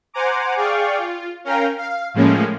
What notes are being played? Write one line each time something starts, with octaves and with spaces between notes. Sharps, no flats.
C5 F#5 G#5 A#5 D6
G#4 D5 F5 G5 C#6
F4
C#4 A#4 F5 G5 A#5
F5
A2 F3 G#3 A#3 C#4